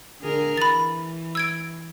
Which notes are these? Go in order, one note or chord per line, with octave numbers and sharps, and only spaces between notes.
D3 G#4 A#4
E3 B5 A6
E6 G#6 D7